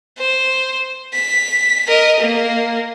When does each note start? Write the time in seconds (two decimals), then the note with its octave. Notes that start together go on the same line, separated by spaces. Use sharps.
0.18 C5
1.13 B6
1.88 A#4 D#5
2.20 A#3